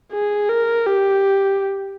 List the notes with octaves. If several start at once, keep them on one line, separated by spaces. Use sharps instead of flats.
G#4
A#4
G4